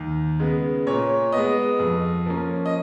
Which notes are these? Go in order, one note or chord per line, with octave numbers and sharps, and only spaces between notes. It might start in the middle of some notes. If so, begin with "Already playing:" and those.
Already playing: D#2
C#3 G#3 B3
A#2 C#5
B3 D#5
G#3
F2
F3 A#3 C#4
D#5